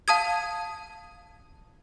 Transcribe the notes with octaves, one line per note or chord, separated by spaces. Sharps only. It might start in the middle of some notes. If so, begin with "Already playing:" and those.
F5 A5 D#6 G#6